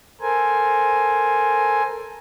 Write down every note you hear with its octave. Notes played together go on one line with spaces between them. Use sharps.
A4 A#4 C5 G#5